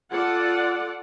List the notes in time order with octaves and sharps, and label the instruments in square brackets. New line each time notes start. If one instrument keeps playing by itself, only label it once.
[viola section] F4 A4 D5 F#5